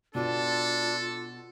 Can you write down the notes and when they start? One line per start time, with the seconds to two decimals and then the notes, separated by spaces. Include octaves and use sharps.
0.15 B2 D4 F4 A4